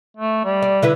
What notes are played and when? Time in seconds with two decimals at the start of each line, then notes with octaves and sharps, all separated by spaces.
0.17 A3
0.45 G3
0.62 D5
0.82 D3 E4 B4